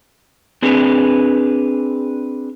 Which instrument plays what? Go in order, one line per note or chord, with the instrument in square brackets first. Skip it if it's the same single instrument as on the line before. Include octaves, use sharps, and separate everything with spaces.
[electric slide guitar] C4 D4 G#4 B4